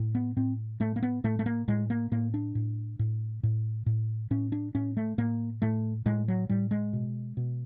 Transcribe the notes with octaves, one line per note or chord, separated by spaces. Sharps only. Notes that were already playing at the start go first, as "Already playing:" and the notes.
Already playing: A2
B3
A2 C4
A2 A3
A#3
B3
A2 A3
A3
A#3
A2 G#3
A#3
A2 A#3
D4
A2
A2
A2
A2
A2 C#4
D4
A2 C#4
A3
A2 A#3
A2 A3
A2 G#3
F#3
A2 G3
G#3
B2
B2